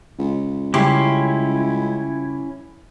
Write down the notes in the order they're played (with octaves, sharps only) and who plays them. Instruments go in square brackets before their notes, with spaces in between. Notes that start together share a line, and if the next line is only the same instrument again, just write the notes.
[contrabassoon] C#2
[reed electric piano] C#3 G3 [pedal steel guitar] C#4 E4 [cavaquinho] G4 C6